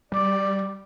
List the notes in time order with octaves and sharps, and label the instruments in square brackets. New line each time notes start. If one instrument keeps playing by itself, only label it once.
[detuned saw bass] G3 [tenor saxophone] D5